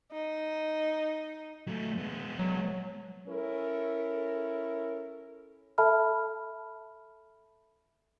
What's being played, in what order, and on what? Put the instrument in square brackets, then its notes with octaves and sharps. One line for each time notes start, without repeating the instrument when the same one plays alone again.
[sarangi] D#4
[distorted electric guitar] F#3 A3
G#3 B3
[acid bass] F#3
[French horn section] C#4 E4 A4 A#4
[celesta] A4 E5 A5 B5 F6